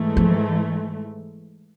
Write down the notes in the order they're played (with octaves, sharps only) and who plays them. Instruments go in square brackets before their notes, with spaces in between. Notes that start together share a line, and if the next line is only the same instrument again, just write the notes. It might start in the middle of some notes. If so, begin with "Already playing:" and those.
Already playing: [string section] G#2 E3 A3
[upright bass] F3